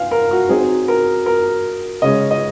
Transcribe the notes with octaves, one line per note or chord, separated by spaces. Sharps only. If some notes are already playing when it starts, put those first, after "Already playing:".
Already playing: F5 F#5 G#5
A#4
F#4
F#3 C4 D#4 G#4
A#4
A#4
C#3 G#3 C#4 D#5
D#5